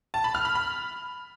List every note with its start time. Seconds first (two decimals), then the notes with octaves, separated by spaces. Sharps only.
0.14 A5
0.24 B5
0.35 F6
0.45 B5
0.55 B5